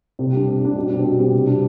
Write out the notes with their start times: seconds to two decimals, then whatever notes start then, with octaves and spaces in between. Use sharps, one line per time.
0.19 C3
0.33 G3 D4
0.47 C3
0.61 G3 D4
0.76 B2
0.90 G3 C4
1.04 B2
1.19 G3 C4
1.33 C3
1.47 G3 D4